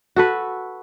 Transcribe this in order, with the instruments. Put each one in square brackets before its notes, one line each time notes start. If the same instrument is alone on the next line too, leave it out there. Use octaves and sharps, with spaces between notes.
[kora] F#4 A4 B4